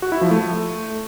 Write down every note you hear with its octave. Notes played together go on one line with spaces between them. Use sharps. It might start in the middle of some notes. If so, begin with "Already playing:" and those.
F#4
E4
F3
A3